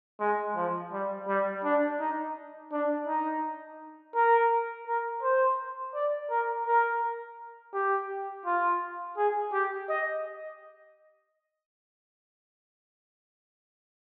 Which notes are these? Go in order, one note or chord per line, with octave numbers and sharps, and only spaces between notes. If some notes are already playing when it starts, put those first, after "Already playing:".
G#3
F3
G3
G3
D4
D#4
D4
D#4
A#4
A#4
C5
D5
A#4
A#4
G4
F4
G#4
G4
D#5